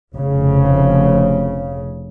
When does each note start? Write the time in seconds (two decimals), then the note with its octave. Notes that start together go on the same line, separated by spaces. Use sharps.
0.14 F1 C#3